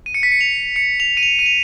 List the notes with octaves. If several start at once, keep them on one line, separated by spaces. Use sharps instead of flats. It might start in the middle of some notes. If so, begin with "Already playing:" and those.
D#7
C#7
B6
C#7
F7
C#7
F7
D#7
F7
D#7
F7